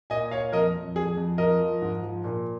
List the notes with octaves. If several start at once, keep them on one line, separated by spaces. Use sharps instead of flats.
A#2 D#5 G#5
A#2 C#5 F5
F2 A#4 D#5
F2
F2 G#4
F2
F3 A#4 D#5
F3
G#2
F3
A#2